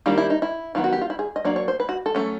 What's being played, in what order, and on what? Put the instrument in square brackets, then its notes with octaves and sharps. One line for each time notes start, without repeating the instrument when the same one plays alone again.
[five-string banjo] D#3 G3 A#3 D4 F4
E4
D#4
E4
D#3 F#3 B3 F4
F#4
G4
F4
E4
G#4
D#5
F#3 A#3 D4 D5
C#5
C5
B4
F#4
A4
F#3 A3 C#4